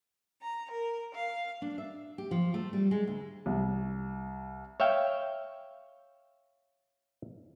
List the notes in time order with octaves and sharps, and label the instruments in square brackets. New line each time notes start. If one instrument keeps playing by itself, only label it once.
[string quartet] A#5
A#4
F5
[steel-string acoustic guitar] D4
E5
G4
F3
A3
G3
G#3
D2
[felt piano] C2
[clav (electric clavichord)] C#5 E5 F5 G5